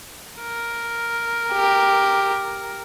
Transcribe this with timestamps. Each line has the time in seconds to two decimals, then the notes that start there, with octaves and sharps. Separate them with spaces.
0.39 A#4
1.53 G4